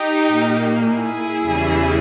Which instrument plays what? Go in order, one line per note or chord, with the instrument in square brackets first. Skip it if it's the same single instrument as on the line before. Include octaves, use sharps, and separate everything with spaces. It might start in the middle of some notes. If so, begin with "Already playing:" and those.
Already playing: [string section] D#4 G4
A#2 A#3
E4 G#4
E2 C#3 E3 G3